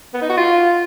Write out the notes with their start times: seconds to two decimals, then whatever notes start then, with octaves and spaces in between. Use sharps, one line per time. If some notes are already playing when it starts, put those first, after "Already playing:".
0.14 B3
0.22 D#4
0.29 F#4
0.37 F4